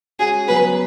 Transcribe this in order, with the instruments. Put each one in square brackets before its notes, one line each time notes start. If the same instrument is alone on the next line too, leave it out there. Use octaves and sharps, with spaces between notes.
[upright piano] G#3 C#4 F#4 [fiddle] G#4
[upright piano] F#3 B3 F#4 [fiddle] B4